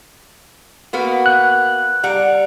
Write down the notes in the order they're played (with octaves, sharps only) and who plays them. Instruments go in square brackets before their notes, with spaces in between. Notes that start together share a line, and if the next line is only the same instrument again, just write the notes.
[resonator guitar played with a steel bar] A#3 B3 F#4
[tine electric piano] F#6
[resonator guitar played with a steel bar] G3 F#5 A#5